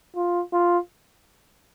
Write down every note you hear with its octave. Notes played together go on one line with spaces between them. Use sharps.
F4
F4